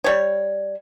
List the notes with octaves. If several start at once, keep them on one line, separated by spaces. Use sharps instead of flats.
G3 C#5